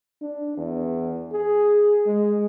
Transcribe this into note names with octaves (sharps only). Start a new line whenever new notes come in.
D4
E2
G#4
G#3